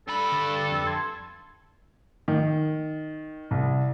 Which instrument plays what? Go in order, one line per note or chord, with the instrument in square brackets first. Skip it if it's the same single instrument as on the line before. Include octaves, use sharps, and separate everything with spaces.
[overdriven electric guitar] G2 B5 [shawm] A4
[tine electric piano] D3 A6
F2
A5 C6 G#6
[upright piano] D#3
C2